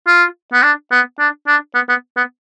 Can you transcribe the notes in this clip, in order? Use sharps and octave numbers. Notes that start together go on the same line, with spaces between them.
F4
B3
D4
B3
D4
D4
B3
B3
B3